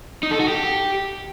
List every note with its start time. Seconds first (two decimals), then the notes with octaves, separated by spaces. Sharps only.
0.23 D#4
0.31 A4
0.40 F#4
0.48 G4